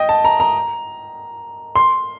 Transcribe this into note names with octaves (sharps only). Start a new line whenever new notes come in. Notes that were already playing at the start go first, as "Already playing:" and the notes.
Already playing: D#5 G5
A5
A#5
A#5
C6